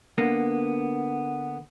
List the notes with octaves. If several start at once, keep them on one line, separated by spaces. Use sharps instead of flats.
D3 A#3 B3